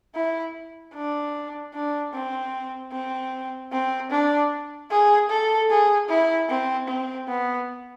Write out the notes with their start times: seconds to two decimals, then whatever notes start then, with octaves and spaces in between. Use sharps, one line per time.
0.15 E4
0.94 D4
1.74 D4
2.13 C4
2.92 C4
3.72 C4
4.11 D4
4.90 G#4
5.30 A4
5.70 G#4
6.09 E4
6.49 C4
6.88 C4
7.28 B3